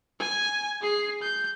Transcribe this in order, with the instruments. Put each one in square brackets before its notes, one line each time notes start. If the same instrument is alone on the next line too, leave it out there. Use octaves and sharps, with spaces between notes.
[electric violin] G#5
G#4 C7
G6